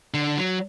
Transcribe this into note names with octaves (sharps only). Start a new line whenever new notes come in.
D3
F#3